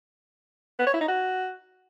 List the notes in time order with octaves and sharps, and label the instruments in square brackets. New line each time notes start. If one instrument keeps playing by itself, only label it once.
[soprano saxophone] B3
C#5
E4
D#4
F#4